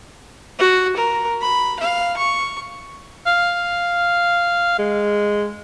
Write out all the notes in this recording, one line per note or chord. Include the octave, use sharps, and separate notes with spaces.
F#4
A#4
B5
F5
C#6
F5
G#3